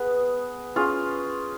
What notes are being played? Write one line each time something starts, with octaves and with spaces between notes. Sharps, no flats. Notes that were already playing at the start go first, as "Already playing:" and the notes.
Already playing: B3 G#4 B4
C#4 F4 G#4